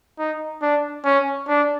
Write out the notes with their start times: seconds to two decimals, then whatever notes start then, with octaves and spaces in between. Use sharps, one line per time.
0.19 D#4
0.62 D4
1.05 C#4
1.49 D4